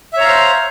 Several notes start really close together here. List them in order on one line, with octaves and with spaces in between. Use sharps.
E5 C#5 A#5 F5 C5